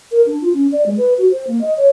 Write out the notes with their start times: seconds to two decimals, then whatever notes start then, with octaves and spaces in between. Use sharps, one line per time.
0.12 A#4
0.26 D4
0.42 F4
0.54 C#4
0.72 D5
0.86 G#3
0.98 B4
1.18 F#4
1.31 C5
1.47 A#3
1.61 D#5
1.77 C#5